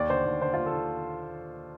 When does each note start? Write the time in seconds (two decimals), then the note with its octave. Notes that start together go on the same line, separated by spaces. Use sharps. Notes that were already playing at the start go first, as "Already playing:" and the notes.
Already playing: D#2 D5
0.10 D3 C5
0.25 D#2
0.42 D3 C5
0.54 D#2 F4
0.66 A4
0.73 D3